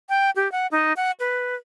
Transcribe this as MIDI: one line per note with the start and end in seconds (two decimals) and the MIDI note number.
0.09 0.30 79
0.36 0.51 67
0.52 0.67 78
0.71 0.93 63
0.97 1.11 78
1.20 1.56 71